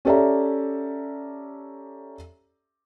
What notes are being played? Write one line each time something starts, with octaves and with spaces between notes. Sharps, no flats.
C#4 G4 A4 D5 E5 A#5